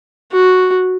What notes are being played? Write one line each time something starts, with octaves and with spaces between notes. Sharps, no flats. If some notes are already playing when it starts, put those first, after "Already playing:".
F#4